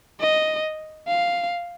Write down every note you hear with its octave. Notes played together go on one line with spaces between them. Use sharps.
D#5
F5